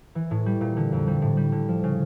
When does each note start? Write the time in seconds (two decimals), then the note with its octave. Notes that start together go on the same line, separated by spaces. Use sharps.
0.15 E3
0.31 A2
0.46 G3
0.61 A#2
0.77 D3
0.92 F2
1.07 G3
1.22 A2
1.37 G3
1.52 D3
1.68 F3
1.83 C#3